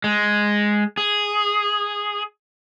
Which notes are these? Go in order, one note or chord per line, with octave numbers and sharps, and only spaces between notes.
G#3
G#4